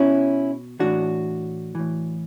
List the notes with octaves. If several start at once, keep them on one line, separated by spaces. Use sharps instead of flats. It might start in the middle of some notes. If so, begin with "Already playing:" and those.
Already playing: B2 C#4 E4
A2 E3 D4 F#4
A2 E3